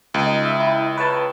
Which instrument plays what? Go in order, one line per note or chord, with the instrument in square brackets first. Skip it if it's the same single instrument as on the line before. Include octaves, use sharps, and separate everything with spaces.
[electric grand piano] C#2
[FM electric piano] D#4
E5
E4
B4 C#5 A5